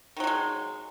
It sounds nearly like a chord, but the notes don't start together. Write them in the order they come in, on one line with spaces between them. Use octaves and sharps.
D#3 F#3 D3 G#3